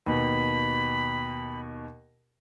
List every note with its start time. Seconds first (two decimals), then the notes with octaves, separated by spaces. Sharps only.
0.06 D#2 B2 B5